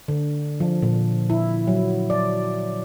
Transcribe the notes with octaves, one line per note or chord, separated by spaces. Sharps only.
D3
F3
A#2
E4
F#3
D5